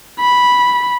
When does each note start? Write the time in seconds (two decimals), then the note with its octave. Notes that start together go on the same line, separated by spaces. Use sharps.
0.20 B5